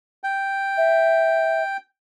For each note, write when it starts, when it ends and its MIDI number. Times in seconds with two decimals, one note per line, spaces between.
0.24 1.77 79
0.77 1.63 76